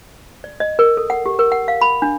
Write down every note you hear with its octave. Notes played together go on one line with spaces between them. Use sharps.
D5
D#5
A#4
A4
F#5
G4
A#4
F#5
F5
B5
D4